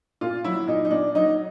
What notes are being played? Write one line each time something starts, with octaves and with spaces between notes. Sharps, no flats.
A#2 F4
F#3 E4
A#2 D#4
D#4
A#2 D4
F#3 D#4